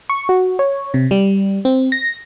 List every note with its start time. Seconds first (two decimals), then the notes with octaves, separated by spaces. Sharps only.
0.10 C#6
0.29 F#4
0.59 C#5
0.94 C3
1.11 G3
1.65 C4
1.92 A#6